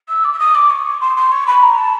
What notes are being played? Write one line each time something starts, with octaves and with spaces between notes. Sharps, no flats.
E6
D6
E6
D#6
D6
C#6
C6
C6
C#6
B5
A#5
A5